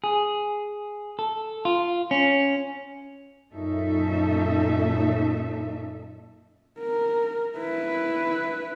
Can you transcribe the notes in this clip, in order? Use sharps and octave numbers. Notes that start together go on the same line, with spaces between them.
G#4
A4
F4
C#4
F#2 A#2 C#4 D#4 A4 E5
A#4
E4 B4